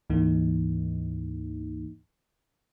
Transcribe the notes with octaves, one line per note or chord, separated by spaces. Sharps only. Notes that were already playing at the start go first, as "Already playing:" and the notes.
D2 G#2 E3 A#3 D#4